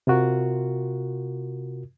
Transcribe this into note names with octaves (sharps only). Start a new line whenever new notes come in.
C3 F4 F#4 A#4